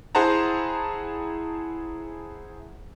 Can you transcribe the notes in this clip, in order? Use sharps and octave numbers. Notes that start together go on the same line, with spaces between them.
E4 G#4 C5 F#5 A5 A#5